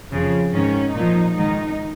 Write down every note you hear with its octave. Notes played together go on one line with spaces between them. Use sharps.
F2 C#3 F3
G#2 D#3 C#4
A#2 F3 D#4
G#2 D#3 D#4